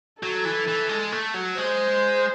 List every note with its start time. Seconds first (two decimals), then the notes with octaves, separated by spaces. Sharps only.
0.22 F#3 A4
0.45 E3
0.68 E3
0.89 G#3
1.12 A3
1.34 F#3
1.57 G#3 C5